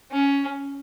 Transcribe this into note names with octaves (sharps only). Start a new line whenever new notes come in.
C#4